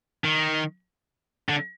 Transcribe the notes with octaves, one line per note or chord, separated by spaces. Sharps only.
D#3
D3